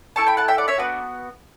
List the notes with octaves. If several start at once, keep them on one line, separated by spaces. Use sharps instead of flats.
A3 E4 A4 A5 C#6
G5 B5
F#5 A5
E5 G5
D5 F#5
C#5 E5
B3 D4 F#4 B4